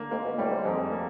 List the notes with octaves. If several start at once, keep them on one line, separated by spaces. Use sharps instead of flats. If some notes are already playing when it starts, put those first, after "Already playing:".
Already playing: D3 A#3
G#2 A#3
B2
A2 G3
G#2
F2 G#2
A#3